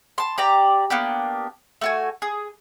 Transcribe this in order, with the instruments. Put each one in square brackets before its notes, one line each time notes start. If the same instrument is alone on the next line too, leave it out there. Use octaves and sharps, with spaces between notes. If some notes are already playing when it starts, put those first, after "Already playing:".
[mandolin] A5 C6
G4 D5 A#5
A#3 B3 D4 G4
A3 F#4 G#5
G#4